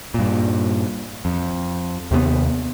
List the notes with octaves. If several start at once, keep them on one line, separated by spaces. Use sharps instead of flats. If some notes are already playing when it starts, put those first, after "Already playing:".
G2 A#2
F2
D#2 C3 G3 B3